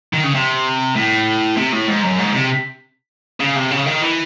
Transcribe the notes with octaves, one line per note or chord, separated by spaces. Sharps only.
D#3
C#3
C3
A2
C3
A2
G#2
F#2
G#2
C3
C#3
C3
C#3
D#3
E3